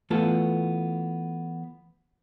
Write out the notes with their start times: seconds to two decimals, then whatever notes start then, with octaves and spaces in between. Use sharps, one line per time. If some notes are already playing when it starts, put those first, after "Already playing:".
0.10 E3 A3 B3 F4 A4 A5